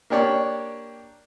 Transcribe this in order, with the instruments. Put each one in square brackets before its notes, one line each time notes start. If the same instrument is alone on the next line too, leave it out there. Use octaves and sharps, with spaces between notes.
[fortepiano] A#3 D4 G4 C#5 D5